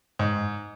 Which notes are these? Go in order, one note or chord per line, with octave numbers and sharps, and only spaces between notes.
G#2